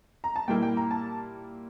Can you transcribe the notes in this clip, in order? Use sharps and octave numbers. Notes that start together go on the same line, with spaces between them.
A#5
A5
A#2 G3 A#3 E4 G5
G5
A#5
A5